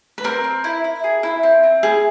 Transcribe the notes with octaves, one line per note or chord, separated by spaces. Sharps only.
B4
C4 A#4
C4
E4
E4
G#4
E4
C4
C4
E4 G#4